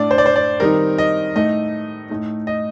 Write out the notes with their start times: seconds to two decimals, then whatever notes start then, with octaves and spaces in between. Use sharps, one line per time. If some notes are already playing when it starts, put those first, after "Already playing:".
Already playing: A2 A3 D4 D5
0.11 C5
0.18 D5
0.26 C5
0.36 D5
0.60 D#3 G3 C4 D#4 A#4
0.98 D#5
1.35 A2 A3 D#4 D#5
2.09 A2 A3 D#4
2.47 D#5